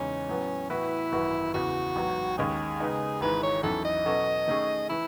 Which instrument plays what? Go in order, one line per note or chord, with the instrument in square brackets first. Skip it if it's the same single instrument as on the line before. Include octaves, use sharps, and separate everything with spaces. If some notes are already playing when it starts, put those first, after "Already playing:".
Already playing: [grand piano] E2 C#3 G#3 D#4 [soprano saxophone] C#4
[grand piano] A2 F#3 B3
[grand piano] A2 E3 B3 F#4 B4 [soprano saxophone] E4
[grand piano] G#1 F#2 E3 B3 F#4
[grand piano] E2 C#3 E3 B3 [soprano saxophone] F#4
[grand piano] A1 G#2 F#3 B3
[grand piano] D#2 D#3 G#3 C#4 [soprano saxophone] G#4
[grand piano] C#3 G#3 B3 D#4
[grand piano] G#1 G#2 E3 G#3 [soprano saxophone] B4
[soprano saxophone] C#5
[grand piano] E2 D#3 F#3 C#4 E4 [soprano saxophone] A4
[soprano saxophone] D#5
[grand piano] B2 F#3 C#4 F#4 A4
D#3 A3 C#4 G#4
[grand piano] E3 [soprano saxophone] E4